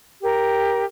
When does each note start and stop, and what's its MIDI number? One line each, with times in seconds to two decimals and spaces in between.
0.21 0.84 67
0.21 0.84 70